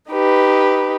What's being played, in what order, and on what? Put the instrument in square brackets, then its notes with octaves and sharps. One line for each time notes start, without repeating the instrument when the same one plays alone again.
[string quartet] D#4 G4 B4